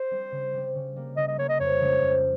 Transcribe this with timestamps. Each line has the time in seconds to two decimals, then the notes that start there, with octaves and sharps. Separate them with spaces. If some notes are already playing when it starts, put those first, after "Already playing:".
Already playing: C5
0.11 G3 C4
0.32 C#3
0.54 G3 C4
0.75 C#3
0.96 G3 A#3
1.17 C#3 D#5
1.28 D#5
1.38 G3 A#3 C#5
1.49 D#5
1.60 F2 C#5
1.81 C#3 F3 G#3 C#4
2.02 F2